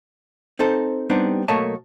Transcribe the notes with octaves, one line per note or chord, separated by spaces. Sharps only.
C4 D#4 A4 C5
G3 B3 C4 D4 D#4 G4
B1 A3 A#3 C#5 D#5 A5